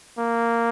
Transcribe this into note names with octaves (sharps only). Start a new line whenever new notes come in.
A#3